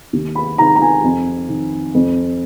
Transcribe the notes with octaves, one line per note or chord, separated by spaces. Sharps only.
D#2
B5
D#3 A#5
A#5
G#5
F2
D#3
F2